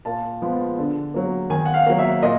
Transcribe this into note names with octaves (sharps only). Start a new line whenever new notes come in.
A#2 A5
F3 G#3 B3
D3
F#3 A#3
D#3 G#5
F#5
F5
F#3 A#3
E5
A#2 D#5